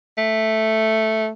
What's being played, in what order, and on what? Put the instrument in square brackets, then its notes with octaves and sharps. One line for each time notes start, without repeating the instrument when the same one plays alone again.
[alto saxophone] A3